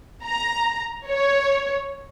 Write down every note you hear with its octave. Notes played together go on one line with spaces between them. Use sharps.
A#5
C#5